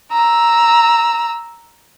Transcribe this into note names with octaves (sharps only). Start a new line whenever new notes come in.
A#5 E6